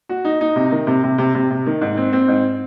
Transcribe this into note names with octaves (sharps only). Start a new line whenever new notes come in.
F#4
D#4
D#4
C3
D#3
C3
C3
C3
C3
C3
D#3
G#2
C4
C4
G#2